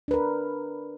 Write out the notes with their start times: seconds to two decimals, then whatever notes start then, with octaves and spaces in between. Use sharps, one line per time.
0.08 D4
0.11 B4
0.14 A#4